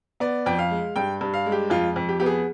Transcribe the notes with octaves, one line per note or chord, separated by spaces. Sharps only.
B3 D5
F2 G5
F5
G#3
G2 G5
G2
F5
G#3
G4
F2 F4
F2
G4
B3 G4
G#4